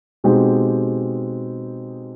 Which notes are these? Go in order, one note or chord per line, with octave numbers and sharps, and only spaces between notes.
B2 G#3 C4 D#4 G4